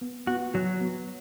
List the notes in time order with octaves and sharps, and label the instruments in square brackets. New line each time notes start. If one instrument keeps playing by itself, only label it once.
[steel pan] B3
[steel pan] B3 [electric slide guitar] F#4
[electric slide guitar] F#3 [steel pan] F#4
[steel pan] B3